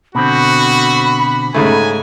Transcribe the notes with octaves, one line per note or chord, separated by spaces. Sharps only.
B2 D3 C4 F#4 B5
G#2 C#3 A3 G#5